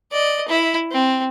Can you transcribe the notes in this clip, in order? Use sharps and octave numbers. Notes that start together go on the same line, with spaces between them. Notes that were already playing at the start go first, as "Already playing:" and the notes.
D5 D#5
E4
C4